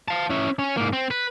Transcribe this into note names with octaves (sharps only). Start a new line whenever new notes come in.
F5 A5
C#4 E4
C#4
G#2 A#3
C4
B4